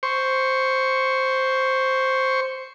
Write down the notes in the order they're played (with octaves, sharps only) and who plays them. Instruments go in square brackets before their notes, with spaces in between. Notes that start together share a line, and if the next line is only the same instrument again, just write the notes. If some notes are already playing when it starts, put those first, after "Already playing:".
[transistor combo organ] C5 C#6